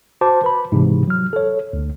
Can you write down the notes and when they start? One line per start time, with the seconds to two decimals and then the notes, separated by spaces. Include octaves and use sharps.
0.21 F#4 C5 A5 D6
0.44 B4 B5
0.72 G#2 C3 E3
1.08 F#3 F6
1.33 A4 C#5
1.73 D2